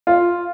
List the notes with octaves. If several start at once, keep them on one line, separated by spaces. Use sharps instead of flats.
F4